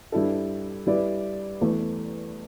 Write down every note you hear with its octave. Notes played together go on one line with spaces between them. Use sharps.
G2 G3 E4 A4
G3 E4 B4 D5
E2 E3 A3